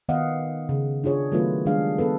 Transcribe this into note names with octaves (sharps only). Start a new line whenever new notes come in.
D#3 B3 D#5 F5 F#5
C#3
D4 F4 G#4 C#5
D#3 F#3 A3 B3 F4 B4
D#3 G3 G#3 D4 G#4 F5
B3 A4 B4